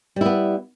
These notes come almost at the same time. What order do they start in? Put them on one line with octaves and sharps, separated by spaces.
G3 E4 B3